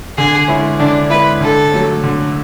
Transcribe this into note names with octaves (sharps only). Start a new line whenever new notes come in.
D3 G#4
G#3 C#4 E4
D3 D4
G#3 C#4 E4 B4
D3 A4
F#3 A3 C#4
D3